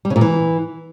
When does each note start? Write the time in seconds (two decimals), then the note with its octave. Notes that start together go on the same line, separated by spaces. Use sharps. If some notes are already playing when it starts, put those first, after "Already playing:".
0.05 G3
0.10 C#3
0.16 A#2
0.21 E3